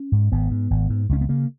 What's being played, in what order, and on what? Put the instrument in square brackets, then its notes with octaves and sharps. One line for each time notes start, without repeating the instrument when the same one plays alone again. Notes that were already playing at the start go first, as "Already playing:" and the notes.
Already playing: [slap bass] C#4
G#2
G#1 B3
G#2
G#1
G#2
C#2 C#4
B3
C#3 A#3